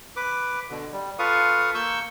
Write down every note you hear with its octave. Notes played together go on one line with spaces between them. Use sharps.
B4 D6
B2 D3
G3
F4 A4 B4 F5 C#6 D#6
A#3 C#6 E6 G6